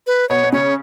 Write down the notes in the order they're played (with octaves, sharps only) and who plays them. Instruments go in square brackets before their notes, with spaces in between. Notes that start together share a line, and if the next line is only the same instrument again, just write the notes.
[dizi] B4
[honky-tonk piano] B2 B3 [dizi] C#5
[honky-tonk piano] B3
[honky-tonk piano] C#3 C#4 [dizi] C#5